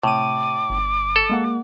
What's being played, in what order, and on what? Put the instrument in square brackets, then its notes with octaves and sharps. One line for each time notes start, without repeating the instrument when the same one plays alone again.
[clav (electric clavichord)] A2 [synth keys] C3 D#7 [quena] D6
[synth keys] G1
[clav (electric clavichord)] A4
[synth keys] G#3 A#3 F#5